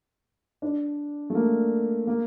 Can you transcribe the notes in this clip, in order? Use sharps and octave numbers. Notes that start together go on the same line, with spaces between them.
D4
A3
A#3
A#3